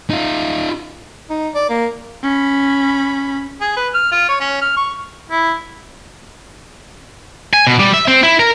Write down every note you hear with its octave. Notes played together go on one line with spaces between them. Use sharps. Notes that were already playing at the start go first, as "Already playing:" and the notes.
D#4 F4
D#4
D5
A#3
C#4 B5
G#4
B4
F6
F4
C#5
C#4
F6
C#6
E4
G#5
B2
G3
E5
C4
E4
A#4